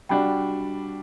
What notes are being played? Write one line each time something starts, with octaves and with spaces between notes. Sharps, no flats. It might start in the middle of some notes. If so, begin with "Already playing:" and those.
G3 D4 F#4 G5 B5